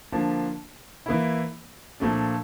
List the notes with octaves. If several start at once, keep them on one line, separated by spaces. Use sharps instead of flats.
D3 F3 A#3 D4 F4
E3 A#3 E4
A#2 F3 A3 D4